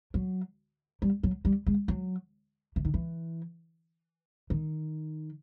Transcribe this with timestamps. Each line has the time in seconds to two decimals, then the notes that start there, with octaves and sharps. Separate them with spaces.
0.14 F#3
1.02 G3
1.23 F#3
1.45 G3
1.66 G#3
1.88 F#3
2.76 E3
2.85 D#3
2.94 E3
4.50 D#3